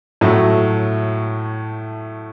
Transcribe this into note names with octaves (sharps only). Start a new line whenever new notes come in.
A2 F#3 A3